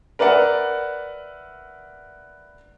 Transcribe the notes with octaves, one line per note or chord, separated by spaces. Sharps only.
A#4 B4 D5 E5 F#5